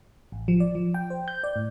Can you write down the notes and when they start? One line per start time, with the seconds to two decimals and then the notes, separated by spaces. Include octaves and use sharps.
0.32 A1
0.48 F3
0.60 D5
0.75 F3
0.94 G5
1.10 C5
1.28 G6
1.44 D5
1.56 A2